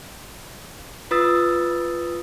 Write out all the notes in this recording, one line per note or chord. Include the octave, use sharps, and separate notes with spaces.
F4 B4 D#6 E6 A6